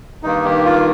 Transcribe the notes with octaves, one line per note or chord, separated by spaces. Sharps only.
G2 D#3 A#3 D#4
G4
F4